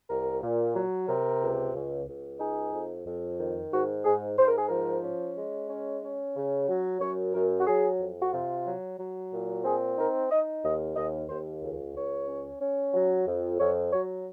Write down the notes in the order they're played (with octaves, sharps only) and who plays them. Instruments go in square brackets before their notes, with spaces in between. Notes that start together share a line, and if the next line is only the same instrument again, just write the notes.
[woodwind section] C2 A#4
A#2
F#3
C3 A#4
C#2
C#2
C#2
D#4 G#4
F2
F2
D#3
G#2 F#4
G#2 G#4
G#2 C5
A#4
G#4
F3 A#4
C#4
G#3
C#4
C#4
C#3
F#3
F#2 C#5
F#2 A#4
F#4
F#3 G#4
F2
F#4
C3 F4
F#3
F#3
A#2
C4 G#4
D#4 A#4
D#4 D#5
D#2 D#5
D#2 D#5
D#2 C5
C#2
C#2 C#5
C#4
C#4
F#3
F2
F2 C#5
F#3 C#5